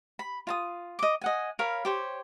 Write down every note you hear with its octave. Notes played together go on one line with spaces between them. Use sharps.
B5
F4 A5 D#6
D#5 D6
D#5 F#5 G#5
A#4 C#5 F5 B5
G4 C5 C#5